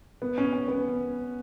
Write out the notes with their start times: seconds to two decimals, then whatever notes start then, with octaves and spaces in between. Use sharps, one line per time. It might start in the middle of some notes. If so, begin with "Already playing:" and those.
0.22 B3
0.38 C#4
0.53 C#4
0.68 B3